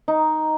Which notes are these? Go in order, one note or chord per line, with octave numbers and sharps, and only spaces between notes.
D#4